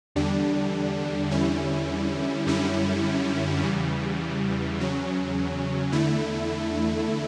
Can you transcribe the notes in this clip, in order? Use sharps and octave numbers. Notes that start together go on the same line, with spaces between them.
E2 D3 G3 D4
E2 D3 G3 C#4 E4
F#2 D3 G3 C#4 E4
E2 C#3 E3 G3
E2 C#3 F#3 C#4
E2 D3 A3 E4